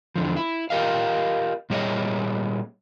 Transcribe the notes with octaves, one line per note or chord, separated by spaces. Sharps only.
E2 D3 F3
E4
F4 G4 A#4 D#5 F5
A#2 G3 G#4 C#5 D#5 E5